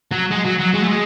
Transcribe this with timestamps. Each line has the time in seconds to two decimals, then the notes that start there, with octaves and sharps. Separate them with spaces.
0.12 F#3
0.32 G#3
0.45 F#3
0.60 F#3
0.74 G#3
0.83 A3
0.88 G#3